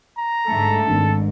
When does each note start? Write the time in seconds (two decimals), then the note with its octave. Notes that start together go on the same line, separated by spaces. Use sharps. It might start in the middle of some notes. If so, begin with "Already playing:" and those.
0.19 A#5
0.48 G#2 D3 A3 A4
0.87 G#1 G#2 D4